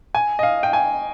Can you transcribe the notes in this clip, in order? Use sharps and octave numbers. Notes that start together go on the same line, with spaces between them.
G#5
D#5
F5
G5
G#5